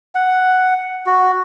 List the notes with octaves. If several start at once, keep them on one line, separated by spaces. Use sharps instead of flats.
F#5
F#4